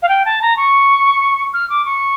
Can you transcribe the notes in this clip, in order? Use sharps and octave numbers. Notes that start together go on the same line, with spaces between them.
F5
G5
A5
A#5
C#6
F6
D6
C#6